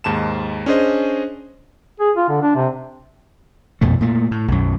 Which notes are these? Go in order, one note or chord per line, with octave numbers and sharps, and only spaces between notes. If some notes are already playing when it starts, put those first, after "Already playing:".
D#2 G#2 A5 E7
C#4 D4 G#4 C5 D#5
G#4
F4
D3
D4
C3
A#1 F2 B2 A3
A#2 A3
A2
B1 F#2